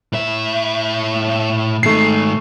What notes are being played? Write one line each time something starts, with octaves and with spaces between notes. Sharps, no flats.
A2 E5
G#2 D#3 A3 C7